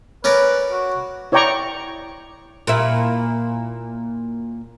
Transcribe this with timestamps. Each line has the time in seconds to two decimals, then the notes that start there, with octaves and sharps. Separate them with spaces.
0.24 C#4 A#4 B4 D5
0.72 F#4
1.32 E4 C#5 D5 G5 A#5 C#6
2.67 A#2 E4